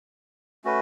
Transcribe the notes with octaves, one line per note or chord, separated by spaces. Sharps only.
A3 C#4 F#4 B4